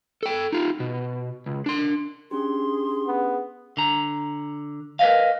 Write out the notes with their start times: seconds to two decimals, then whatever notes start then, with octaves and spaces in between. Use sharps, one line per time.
0.23 A4 G5
0.52 D#4 F4
0.80 B2
1.46 C#2
1.66 D4 C6
2.31 C#4 D4 G4 G#4 C6
3.07 B3
3.77 D3 A#5
4.99 A#4 B4 C#5 D#5 F5